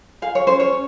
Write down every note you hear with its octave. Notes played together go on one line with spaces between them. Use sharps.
G#4 F5
C#5
C#4 C5
C#5
C#4